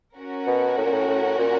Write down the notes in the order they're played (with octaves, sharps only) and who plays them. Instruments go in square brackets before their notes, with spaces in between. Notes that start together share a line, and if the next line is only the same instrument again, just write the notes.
[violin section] C#4 F#4 A#4
[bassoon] B2
A2
A#2
A2
A2
A#2